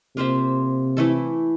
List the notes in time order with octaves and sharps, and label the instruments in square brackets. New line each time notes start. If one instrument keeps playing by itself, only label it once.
[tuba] C3 [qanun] A#3 F4 C5 E5
[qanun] E3 A3 E4 A4